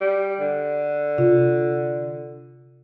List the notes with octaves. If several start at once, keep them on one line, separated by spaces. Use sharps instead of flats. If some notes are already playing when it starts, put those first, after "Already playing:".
G3
D3
C3 F4